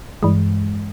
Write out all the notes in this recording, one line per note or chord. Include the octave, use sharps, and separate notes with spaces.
G2 E3 G#3